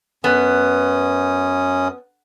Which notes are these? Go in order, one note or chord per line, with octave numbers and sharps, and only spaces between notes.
F#2 B3 C#4 D#6